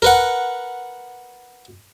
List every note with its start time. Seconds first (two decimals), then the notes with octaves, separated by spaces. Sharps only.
0.02 A#4 B4 F#5